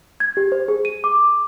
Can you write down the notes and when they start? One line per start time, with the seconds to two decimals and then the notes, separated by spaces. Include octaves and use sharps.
0.20 G#6
0.37 G4
0.52 C5
0.68 G#4
0.85 D#7
1.04 D6